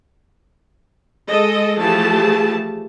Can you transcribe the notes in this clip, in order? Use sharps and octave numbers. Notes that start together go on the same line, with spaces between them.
G#3 A4 D#5
E3 F3 A3 G4 G#4 A5